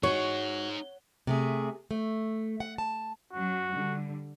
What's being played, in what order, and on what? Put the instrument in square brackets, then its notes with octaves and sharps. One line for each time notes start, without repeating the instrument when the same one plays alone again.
[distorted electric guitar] D#4 G#4 [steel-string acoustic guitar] F#4 [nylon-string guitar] C#5
[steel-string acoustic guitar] C3 A3 G#4
A3
F#5
A5
[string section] F#2 F#3 [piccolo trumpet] F#4
[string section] D3 G3